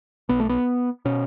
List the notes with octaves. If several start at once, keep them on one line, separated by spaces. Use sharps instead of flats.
B1 B2 B3
A3
B3
B2 C#4